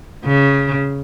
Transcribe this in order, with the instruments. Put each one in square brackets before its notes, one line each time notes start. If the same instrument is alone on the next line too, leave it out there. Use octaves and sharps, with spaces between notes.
[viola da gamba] C#3